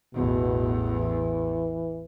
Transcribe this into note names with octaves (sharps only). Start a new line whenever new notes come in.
A1 E2 B2
E3